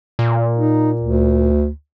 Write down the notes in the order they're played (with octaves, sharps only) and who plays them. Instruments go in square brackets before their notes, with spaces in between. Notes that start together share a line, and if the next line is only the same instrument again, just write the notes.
[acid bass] A#2
[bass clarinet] D#4
D2